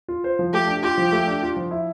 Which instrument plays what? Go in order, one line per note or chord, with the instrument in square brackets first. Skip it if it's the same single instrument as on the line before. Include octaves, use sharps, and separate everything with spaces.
[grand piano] F4
C5
F3
[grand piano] A3 [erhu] G4
[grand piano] D4
[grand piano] F4 [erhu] G4
[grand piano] F3
A3
D4
F4
F3
E4